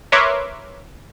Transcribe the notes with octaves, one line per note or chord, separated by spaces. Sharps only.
A#4 B4 C#5 E5 C6 D6